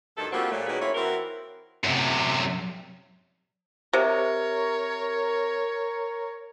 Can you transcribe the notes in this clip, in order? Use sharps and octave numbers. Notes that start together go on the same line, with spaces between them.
D2 G2 D#3 A4
G3 A3 A#3 C4 F4 F#4
A#2 F#3 A3
D#3 A#3 C#4 F#4 G#4 B4
A#3 C4 E4 C#5
E3 C4 E4 F#4 A#4
F#2 C3
C3 A#4 C#5